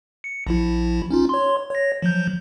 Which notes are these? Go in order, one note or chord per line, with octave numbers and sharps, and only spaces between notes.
C#7
A#1 F3 E4
C#4 D#4 F4
C#5 C6
C#5 A#6
F3 F#3 G6